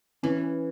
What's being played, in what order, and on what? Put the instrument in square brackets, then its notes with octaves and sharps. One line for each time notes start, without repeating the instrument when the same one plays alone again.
[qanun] E3 [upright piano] C#4